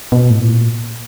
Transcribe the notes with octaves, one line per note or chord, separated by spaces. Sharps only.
B2
A2
A#2